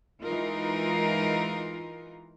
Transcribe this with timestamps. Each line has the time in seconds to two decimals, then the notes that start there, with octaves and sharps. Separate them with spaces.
0.22 E3 G#3 D#4 F4 A#4